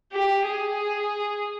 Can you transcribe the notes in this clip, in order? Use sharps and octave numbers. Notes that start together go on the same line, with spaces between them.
G4
G#4